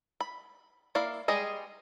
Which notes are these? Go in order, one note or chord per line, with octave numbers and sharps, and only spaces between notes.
B5
A#3 E4 D5 F5
G3 G#3 G#4 D#5